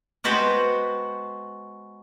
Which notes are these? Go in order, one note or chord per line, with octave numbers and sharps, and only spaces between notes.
G#3 B3 F#4 B4 C5 G5